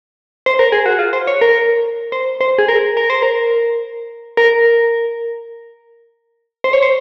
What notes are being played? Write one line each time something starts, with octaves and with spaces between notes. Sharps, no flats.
C5
A#4
G#4
F#4
F4
C5
C#5
A#4
C5
C5
G#4
A#4
A#4
C5
A#4
A#4
C5
C#5
C5